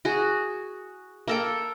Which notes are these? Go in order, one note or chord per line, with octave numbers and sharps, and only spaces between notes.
F#4 G#4
A#3 A4 G5